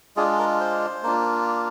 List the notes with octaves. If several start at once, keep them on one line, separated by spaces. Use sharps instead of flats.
G#3 D4 F4 G#4
A#4
C5
A#3 D4 F4